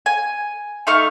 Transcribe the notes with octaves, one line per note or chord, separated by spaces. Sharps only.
G#5
A3 D#4 F5 C#6